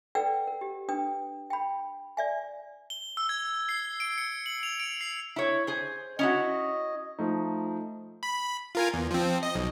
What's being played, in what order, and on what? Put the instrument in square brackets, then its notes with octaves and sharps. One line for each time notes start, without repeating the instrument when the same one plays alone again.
[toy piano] A4 B4 D5 F#5 G5 E6
A#4
G4
D4 B4 G5 D#6
G5 B5
D5 E5 G#5
[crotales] G7
E6
G#6
C7
D7
C#7
F#7
F7
D7
C7
[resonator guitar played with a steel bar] E4 C#5
G#4 C5
[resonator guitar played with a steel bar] C#4 E4 F#4 [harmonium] D#5
[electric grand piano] F3 A3 D#4
[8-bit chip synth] B5
F4 A#4 G#5
E2
F3 C4
D#5
B1